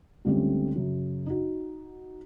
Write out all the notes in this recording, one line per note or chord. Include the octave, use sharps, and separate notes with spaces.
C#2 D3 G3 A3 C4 C#4
F#2 C#3
D#4 F#4